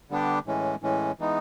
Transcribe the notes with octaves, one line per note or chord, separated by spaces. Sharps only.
D3 G3 B3 D4 G4
A2 E3 G#3 C#4
A2 E3 G#3 C#4
E3 G#3 B3 D#4